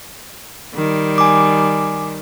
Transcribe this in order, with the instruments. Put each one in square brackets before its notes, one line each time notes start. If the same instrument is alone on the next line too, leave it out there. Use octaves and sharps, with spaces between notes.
[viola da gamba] D#3 G3
[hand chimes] G#5 D6